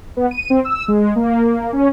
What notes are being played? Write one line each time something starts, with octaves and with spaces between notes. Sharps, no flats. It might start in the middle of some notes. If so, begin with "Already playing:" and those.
B3
D#7
C4
E6
G#3
A#3
C#4